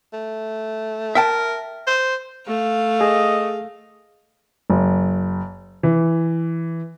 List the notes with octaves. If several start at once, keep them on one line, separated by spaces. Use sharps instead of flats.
A3
A#4 E5 G5 A5
C5
A3 F5
G#4 D#5
F#1
E3